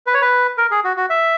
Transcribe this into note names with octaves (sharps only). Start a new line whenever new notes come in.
B4
C#5
B4
A#4
G#4
F#4
F#4
E5